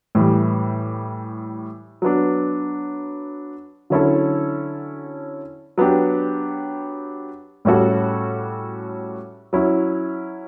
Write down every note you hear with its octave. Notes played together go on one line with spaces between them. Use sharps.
A2 E3 G3
F#3 B3 D4
D3 F#3 C#4 E4 A4
F#3 B3 D4 G4
A2 G3 C#4 F#4 A4
F#3 C#4 E4